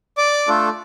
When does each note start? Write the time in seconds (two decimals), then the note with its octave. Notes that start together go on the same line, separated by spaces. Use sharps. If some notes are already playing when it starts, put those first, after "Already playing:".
0.17 D5 D6
0.48 A3 D4 F4 A4